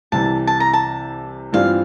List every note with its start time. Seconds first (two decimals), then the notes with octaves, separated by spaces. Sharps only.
0.12 C2 C3 E3 A5
0.47 A5
0.60 A#5
0.73 A5
1.53 G2 E3 G3 C4 F4 F5